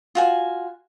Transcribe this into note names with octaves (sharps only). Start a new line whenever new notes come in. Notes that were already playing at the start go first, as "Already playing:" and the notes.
F4 F#4 G#5